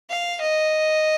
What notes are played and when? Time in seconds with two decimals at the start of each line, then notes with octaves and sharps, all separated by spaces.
0.10 F5
0.41 D#5